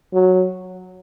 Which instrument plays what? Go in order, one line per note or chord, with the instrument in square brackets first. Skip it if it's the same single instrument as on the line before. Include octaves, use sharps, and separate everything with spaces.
[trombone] F#3